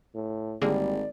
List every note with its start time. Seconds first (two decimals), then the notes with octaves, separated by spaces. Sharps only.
0.15 A2
0.61 G#1 D3 G3 A#3 G#4 D5